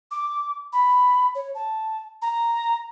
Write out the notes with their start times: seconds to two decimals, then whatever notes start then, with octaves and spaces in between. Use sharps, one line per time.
0.11 D6
0.73 B5
1.35 C#5
1.55 A5
2.22 A#5